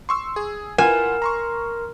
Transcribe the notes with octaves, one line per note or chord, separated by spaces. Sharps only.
C6 C#6 E6
G#4
E4 F4 A#4 F#5 G#5
A#5 C6 C#6